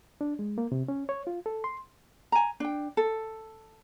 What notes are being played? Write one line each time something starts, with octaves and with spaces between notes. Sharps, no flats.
D4
G#3
A#3
C3
C#4
C#5
F4
A4
C6
G#5 A#5
D4 G5
A4